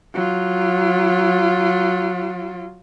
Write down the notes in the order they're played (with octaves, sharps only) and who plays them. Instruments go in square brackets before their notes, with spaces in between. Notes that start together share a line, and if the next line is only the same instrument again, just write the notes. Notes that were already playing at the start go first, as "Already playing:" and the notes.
[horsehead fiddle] F#3 F4